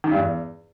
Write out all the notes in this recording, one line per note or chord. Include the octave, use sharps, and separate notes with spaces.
D#3
G2
E2